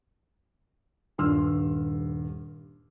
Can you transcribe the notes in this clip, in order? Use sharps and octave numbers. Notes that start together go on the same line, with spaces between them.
D#1 G2 C6 E6 F6